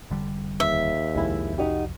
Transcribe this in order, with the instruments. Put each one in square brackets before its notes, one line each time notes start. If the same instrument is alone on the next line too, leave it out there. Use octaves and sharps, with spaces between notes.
[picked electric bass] F1 D3 G3
[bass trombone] D#2 [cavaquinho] E5
[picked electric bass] C2 F2 [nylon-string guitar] G#3 E4
[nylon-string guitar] D#4 F#4 G4